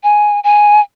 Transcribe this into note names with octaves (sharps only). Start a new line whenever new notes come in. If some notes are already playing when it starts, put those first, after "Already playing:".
G#5
G#5